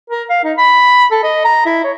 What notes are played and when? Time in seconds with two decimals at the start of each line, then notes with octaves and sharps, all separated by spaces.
0.10 A#4
0.29 F5
0.44 D#4
0.58 B5
1.11 A4
1.23 D#5
1.45 A#5
1.66 E4
1.84 C#5